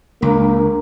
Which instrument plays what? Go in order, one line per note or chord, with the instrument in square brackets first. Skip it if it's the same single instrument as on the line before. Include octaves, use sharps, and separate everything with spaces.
[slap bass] C#2 [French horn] A#3 [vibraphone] D4 A#5